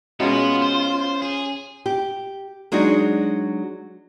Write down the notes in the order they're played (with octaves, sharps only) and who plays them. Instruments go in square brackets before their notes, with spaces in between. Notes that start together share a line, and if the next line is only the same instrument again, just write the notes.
[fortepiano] B2 G#3 [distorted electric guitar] B3 [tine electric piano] C#4 C#5 [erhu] F4
[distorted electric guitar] C5
G#4
[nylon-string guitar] G4
F#3 G#3 D4 D#4 F#4